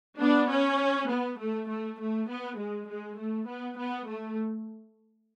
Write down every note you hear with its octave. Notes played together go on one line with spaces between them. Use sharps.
B3 D4
C#4
B3
A3
A3
A3
B3
G#3
G#3
A3
B3
B3
A3